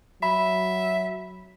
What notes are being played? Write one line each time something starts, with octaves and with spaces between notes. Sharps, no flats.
F#3 E5 B5